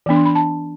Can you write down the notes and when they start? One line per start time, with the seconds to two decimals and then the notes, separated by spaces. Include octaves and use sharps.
0.06 E3 B3 D4
0.16 C6
0.26 B5
0.35 A5